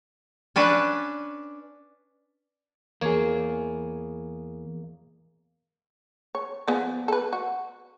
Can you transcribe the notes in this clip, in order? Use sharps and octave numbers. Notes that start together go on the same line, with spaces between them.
C#4 D4 B4 D5
E2 A#3 G#4 C#5
C#5
F3 B3 G#4
A4 B4
F#4